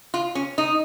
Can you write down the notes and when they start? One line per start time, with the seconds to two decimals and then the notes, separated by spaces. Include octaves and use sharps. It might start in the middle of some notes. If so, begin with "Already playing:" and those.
0.14 F4
0.35 C#4
0.58 D#4